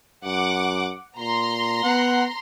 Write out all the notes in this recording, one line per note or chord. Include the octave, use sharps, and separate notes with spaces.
F#2 F#5 D6
A#2 A#5 C6
B3 F#5